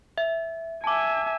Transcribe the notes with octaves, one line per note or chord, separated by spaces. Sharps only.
E5
E5 G#5 A5 D6